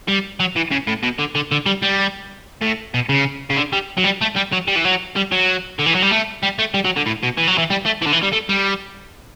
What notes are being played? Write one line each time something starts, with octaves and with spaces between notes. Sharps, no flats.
G3
F#3
E3
C#3
A2
B2
D3
D3
D3
G3
G3
A2
B2
C#3
C#3
D3
G3
F#3
G3
A3
G3
F#3
G3
E3
F#3
G3
F#3
D3
E3
F#3
G3
A3
G3
A3
G3
F#3
D3
A2
B2
E3
F#3
E3
G3
A3
E3
D3
E3
G3
A3
G3